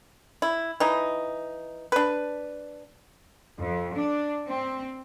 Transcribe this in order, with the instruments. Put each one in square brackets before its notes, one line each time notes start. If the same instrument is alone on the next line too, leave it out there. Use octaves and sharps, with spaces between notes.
[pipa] E4
E3 D#4
D4 B4
[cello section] F2
D4
C4